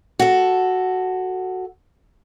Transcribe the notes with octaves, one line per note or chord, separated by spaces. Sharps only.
F#4 A4